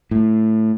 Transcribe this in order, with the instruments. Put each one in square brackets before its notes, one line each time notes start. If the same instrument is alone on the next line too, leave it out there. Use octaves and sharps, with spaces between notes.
[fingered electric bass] A2